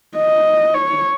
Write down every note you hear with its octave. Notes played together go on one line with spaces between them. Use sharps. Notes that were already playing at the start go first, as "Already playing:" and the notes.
D#5
C#5